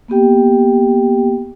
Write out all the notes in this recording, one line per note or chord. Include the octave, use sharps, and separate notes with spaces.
A#3 B3 G4 G5